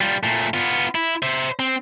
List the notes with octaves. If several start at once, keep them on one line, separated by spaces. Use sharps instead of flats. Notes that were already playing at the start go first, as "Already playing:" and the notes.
G3 F4
A#2 A3
B3 F4
E4
C5 E5
C4